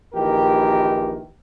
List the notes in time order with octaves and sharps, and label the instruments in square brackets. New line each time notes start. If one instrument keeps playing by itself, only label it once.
[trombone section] A#1 D#3 E3 G4 A#4